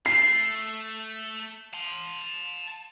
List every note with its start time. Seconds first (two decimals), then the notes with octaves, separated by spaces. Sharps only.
0.06 A3 C7
1.74 A5 C6